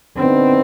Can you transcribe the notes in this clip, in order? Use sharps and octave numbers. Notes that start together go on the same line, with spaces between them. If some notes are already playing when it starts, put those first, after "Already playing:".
D3 G3 B3 C4 D#4